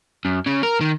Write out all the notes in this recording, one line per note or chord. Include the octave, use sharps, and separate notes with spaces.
F#2
C#3
A#4
D#3